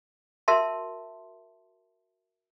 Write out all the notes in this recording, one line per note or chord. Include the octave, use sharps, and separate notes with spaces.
F#4 A#4 E5 A5 C6